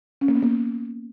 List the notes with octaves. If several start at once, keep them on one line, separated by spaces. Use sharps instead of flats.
C#4
A#3
B3
A#3